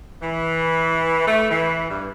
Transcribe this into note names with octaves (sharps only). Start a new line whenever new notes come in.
E3
A3
E3
G2